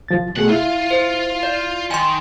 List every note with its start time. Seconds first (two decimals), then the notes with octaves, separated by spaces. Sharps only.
0.08 C2 F3 A6
0.37 B2 A3 G#4 F#5
0.49 E4 F4
0.91 C5
1.43 D5
1.91 D#3 G#5 C6